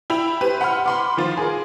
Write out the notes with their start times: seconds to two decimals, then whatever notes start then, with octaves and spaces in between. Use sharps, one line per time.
0.10 E4 G5 B5 F7
0.41 G4 B4 C5
0.61 F#5 B5 C6 F6
0.86 B5 C6 D6
1.17 D#3 F3 F4
1.37 G#4 A#4